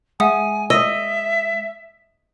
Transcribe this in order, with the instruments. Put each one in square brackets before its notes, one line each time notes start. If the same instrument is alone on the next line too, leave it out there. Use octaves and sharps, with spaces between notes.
[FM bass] G#3 [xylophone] E5 F#5 D#6 [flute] G#5
[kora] D#5 [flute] E5 [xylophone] E6